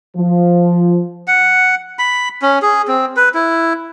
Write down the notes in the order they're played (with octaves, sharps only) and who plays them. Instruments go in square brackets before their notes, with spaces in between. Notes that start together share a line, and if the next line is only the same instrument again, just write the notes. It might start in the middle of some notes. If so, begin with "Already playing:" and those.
[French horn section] F3
[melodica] F#5
B5
C#4
G#4
C4
B4
E4